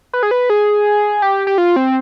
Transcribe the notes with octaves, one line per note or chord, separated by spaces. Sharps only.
B4
G#4
B4
G#4
G4
G4
F4
C4